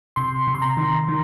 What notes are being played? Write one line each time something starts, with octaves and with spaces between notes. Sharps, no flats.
C3 C6
C3
C6
A#5
D#3
D#3